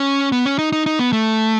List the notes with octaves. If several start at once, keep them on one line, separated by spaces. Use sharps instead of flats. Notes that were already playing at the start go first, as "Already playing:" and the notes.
Already playing: C#4
B3
C#4
D#4
D#4
D#4
B3
A3